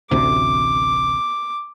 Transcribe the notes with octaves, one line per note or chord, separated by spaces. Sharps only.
A1 D2 C3 D6